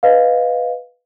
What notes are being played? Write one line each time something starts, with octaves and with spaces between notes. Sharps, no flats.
B4 D#5 F5